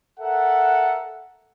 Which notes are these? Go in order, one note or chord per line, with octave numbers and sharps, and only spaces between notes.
A4 A#4 E5 F#5